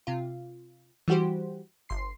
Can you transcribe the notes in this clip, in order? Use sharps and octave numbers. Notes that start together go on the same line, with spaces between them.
C3 F4
E3 G3 F#4 G4 C5
G1 C6 C7